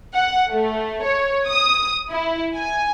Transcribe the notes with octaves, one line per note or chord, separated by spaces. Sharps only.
F#5
A3
C#5
D#6
E4
G#5